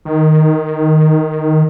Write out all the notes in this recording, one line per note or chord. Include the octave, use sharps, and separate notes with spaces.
D#3